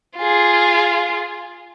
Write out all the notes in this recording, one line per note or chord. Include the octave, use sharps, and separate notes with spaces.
F4 G#4